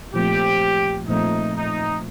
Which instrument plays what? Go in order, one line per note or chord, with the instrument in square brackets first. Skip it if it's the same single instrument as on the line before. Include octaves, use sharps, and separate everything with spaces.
[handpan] A#2 F3 A3 C4 [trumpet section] G4
[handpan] A#2 F3 A3 C4 [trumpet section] D#4
[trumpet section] D#4